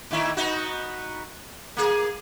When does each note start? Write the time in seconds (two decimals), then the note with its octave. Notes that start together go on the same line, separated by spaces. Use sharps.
0.11 A2 D#3 E4
0.37 B3 D#4 F#4
1.77 A#3 G#4